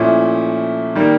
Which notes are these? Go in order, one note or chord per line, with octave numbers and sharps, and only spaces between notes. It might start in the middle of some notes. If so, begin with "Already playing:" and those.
Already playing: A#2 F3 A3 C#4 E4
D#3 G3 A#3